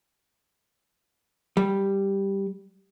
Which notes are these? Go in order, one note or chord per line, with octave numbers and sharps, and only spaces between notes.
G3